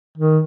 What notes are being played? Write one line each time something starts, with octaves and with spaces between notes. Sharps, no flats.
D#3